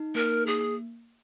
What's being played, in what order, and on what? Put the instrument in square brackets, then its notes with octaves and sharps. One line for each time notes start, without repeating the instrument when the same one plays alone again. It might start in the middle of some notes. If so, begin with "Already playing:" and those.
Already playing: [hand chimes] D#4
[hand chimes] A#3 [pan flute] A#4
[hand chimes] A#3 [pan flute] G#4